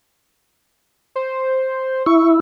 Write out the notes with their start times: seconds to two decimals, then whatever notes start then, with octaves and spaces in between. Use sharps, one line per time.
1.16 C5
2.06 E4 C#6